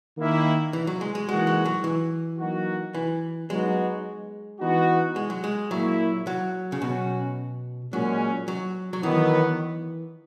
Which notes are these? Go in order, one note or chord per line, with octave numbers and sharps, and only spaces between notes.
D#3 A#3 E4
E3
F#3
G#3
G#3
E3 G#3 A#3 D#4 F#4
G#3
F#3
E3
F#3 A#3 D#4 F#4
E3
F#3 G#3 B3 D#4 F#4
E3 B3 D#4 F#4
G#3
F#3
G#3
A#2 F#3 A#3 E4
F#3
C#3
B2 F#3 C#4 F#4
A#2 F#3 G#3 C#4
F#3
F#3
D#3 E3 F#3 B3